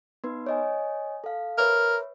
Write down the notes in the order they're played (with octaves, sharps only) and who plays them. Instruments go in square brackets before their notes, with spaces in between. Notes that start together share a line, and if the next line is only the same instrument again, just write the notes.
[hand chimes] B3 D#4 B4
C#5 D#5 G#5
A4 F5
[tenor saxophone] A#4 [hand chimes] B4 C#5 E5